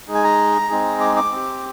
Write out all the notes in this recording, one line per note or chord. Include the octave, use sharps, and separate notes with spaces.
G#3 D#4 G#4
G#5
A#5
G#3 C4 D#4 G#4
D6
D6
C4 G4